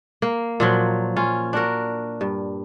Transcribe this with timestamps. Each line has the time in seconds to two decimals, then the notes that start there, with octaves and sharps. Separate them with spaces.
0.22 A#3
0.60 A#2 F3 F#3
1.17 C#4 F4
1.53 D4 F#4 A#4
2.21 G2